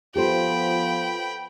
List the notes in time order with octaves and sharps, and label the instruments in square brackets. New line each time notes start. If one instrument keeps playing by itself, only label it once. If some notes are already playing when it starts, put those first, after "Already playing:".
[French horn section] F3 B3 F4 [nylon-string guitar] G4 A4 C5 [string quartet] G5 B5